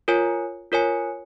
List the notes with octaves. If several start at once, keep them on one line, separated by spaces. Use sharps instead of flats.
F4 A#4 C#5 G#5
F4 A#4 C#5 G#5